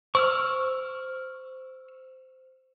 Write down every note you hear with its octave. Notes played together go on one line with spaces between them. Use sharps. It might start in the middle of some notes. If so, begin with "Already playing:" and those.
C5 C#6 E6 F6